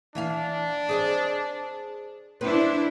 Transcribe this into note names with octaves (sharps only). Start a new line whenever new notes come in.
E3 D4 E5 F5
G#4 C5 D#5
D4 E4 B4 C5